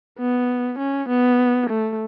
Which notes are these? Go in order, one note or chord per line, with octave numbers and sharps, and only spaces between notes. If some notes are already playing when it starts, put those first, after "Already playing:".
B3
C#4
B3
A3